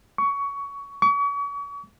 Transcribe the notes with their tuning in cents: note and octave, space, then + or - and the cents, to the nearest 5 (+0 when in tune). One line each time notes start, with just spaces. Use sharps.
C#6 +20
C#6 +40